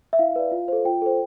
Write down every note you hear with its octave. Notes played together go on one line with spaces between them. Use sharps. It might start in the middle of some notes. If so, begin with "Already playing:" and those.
E5
E4 F5
B4 D5
F4
A4 C5
F4 G5
A4 C5